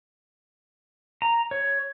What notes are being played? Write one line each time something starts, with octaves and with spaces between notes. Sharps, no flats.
A#5
C#5